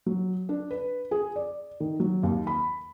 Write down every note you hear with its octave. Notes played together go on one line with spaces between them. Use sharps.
F#3
D4
B4
G#4
D5
D#3
F#3
D#2
B5